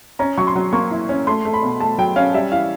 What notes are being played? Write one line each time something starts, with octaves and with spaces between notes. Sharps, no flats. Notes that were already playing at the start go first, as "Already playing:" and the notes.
C#4 A#5
F#3 C#6
C6
F#3
A#3 C#6
E4
C#4
A3 C6
A3
B5
B2
A3 A5
F#3 G5
C#4 F5
G3 E5
E3 F5